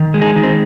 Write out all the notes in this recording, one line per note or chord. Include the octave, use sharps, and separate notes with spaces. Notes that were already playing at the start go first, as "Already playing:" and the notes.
Already playing: D#3
G#3
D#4 G#4
D#3
C4